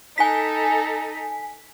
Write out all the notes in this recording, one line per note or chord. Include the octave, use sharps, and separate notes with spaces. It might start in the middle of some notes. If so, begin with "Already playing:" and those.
D#4 A4 G#5 B6